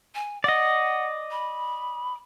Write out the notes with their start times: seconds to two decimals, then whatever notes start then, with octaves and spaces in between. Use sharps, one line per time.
0.15 G#5
0.44 D5 D#5 F#5
1.31 B5